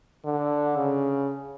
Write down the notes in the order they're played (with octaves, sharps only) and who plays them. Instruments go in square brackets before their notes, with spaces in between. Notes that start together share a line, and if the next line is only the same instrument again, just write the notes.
[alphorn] D3
C#3